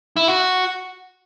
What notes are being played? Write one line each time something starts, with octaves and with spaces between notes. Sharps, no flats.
E4
F#4